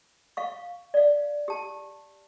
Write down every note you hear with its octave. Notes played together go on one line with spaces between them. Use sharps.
F5 C#6
D5 F5
G4 A5